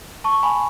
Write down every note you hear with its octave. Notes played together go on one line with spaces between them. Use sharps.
A5 C#6
G#5 B5